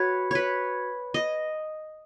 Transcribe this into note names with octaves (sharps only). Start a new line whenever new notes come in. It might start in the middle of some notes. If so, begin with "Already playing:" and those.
Already playing: F#4 B4 C#5
B4 C#5
D#5